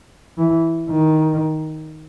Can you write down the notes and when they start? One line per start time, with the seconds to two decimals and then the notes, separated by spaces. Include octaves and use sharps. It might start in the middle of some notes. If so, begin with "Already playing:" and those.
0.38 E3
0.90 D#3